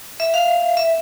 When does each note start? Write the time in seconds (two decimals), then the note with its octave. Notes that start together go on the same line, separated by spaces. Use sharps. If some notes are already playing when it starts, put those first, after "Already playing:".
0.20 E5
0.34 F5
0.77 E5